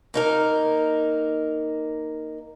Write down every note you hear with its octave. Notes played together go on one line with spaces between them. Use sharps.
A#3 D#4 A#4